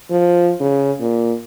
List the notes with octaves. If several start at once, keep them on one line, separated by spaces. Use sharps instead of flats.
F3
C#3
A#2